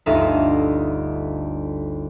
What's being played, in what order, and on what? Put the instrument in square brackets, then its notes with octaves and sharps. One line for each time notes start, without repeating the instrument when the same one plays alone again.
[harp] G1 D2 D#4 F4 E5 F5